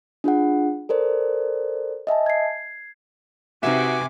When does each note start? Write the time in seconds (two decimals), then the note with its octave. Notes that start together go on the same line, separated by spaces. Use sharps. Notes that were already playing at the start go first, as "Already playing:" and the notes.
0.24 D4 F4 G#4 F#5
0.89 A4 A#4 C5 D5
2.07 D#5 E5 G#5 A5
2.26 G#6 C7
3.63 C3 D#4 F#4 B4 E5 G#5 D6